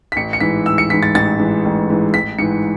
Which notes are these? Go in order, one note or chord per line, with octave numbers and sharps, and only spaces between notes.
B6
A1 C#7
C#7
G#2 E3 B6
A1 E6
C#7
G#2 E3 B6
A6
A1 A6
G#2 E3
A1
G#2 E3
A1 B6
G#2 E3 C#7